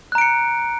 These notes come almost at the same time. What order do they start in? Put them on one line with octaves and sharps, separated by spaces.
F#6 A#5 D7 C#7